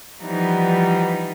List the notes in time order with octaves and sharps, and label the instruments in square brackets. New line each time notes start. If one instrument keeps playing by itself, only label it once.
[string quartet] E3 F3 G3 B3 D#4